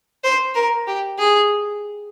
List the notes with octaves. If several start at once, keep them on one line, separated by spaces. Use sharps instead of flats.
C5
A#4
G4
G#4